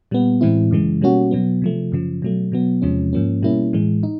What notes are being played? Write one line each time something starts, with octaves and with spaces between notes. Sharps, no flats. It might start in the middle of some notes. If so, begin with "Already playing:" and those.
A#2 G3 B3
A2 E3 G#3 C4 E4
F#2 C#3 E3 G#3
B2 G3 A#3 C#4 F#4
B2 F#3 B3
C3 F3 A3
F#2 C#3 F3
B2 F#3 A3
B2 F#3 B3
E2 C3 F3 G#3 C#4
G#2 F3 A#3 C#4
B2 G3 A#3 C#4 E4
A2 E3 G#3
D#4